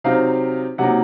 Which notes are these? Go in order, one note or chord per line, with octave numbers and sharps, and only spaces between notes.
C3 F#3 C4 D#4 F5
C3 F#3 A#3 D#4 F#5